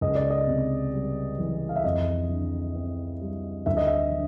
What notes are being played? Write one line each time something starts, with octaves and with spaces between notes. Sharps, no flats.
C#2 D#5
D5
D#5
C3
G3
E3
F5
E5
F2 D#5
D3
C4
G3
D2 E5
D#5
E5
D3